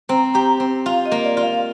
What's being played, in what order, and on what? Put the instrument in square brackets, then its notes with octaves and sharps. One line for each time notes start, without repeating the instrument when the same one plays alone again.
[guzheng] C4 [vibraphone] A#5
[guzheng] G4 [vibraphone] A#5
[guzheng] C4
[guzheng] F4 [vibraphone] F5
[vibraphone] D#5
[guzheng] A#3
[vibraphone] D5
[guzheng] F4
[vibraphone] F5